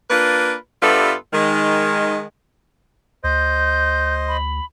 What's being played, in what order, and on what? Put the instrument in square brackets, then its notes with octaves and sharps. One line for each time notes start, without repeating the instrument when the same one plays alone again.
[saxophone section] A#3 D4 F4 B4
G2 G3 B3 F4 A4 E5
D#3 G#3
[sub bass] D2 [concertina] C5 D#5 [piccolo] G6
[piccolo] B5